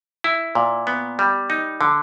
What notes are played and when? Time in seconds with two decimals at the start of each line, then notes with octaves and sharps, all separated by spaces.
0.24 E4
0.55 A#2
0.87 B3
1.19 G3
1.50 D#4
1.81 D3